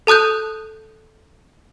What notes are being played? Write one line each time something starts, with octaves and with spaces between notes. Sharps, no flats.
A4 A5 D#6 F#6 G6